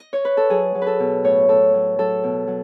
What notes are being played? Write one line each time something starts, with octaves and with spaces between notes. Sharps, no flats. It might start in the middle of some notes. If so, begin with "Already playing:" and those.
Already playing: D#5
C#5
B4
A4
F#3 G#4
F#3
A4 B4
B2
A2 C#5
A2 A4
F#3
F#3 A4
B2
F#3